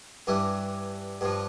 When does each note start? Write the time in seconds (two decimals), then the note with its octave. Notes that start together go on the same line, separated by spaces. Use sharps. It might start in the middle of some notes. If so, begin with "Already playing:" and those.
0.27 G2 E3 G3
1.21 G2 F3